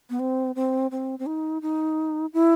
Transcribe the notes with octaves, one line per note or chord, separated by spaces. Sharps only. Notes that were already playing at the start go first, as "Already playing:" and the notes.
B3
C4
C4
C4
C4
D#4
D#4
E4